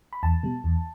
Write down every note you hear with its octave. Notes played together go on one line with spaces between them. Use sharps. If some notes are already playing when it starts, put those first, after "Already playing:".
B5
E2 A5
B2 G3
E2